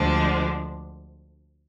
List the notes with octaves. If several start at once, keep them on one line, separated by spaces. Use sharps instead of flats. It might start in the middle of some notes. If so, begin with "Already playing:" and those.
Already playing: D2 D3 F3 G#3 D4